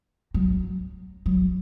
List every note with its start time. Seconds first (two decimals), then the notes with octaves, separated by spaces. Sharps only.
0.34 F#3
1.26 F#3